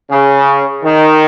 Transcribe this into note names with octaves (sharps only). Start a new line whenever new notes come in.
C#3
D#3